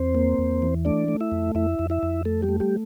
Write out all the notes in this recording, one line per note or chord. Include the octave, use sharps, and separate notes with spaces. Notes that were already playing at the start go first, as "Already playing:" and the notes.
Already playing: E2 C4 C5
A#3
E2
E3
A3 D4 D5
A3
E4 E5
F2
F2 E4 E5
F2
E4 E5
F2
A3 A4
G3 G4
A3
G3 G4